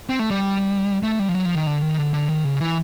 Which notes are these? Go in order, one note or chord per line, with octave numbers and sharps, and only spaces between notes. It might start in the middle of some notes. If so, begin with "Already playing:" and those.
C4
A3
G3
A3
G3
F3
F#3
F3
D#3
D3
D#3
D3
D3
D#3
C#3
E3